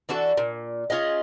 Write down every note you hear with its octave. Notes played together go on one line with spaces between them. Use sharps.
E3 D4 F#4 A4
A#2
C#4 F4 G#4 D#5